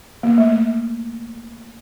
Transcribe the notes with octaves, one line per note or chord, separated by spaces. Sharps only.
A#3
A3
A3